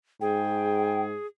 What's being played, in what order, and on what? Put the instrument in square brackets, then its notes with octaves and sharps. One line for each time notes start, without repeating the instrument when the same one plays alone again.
[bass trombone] G#2 [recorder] G#4 [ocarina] G5